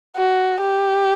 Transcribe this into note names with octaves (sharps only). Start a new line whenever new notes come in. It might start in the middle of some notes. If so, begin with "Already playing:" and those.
F#4
G4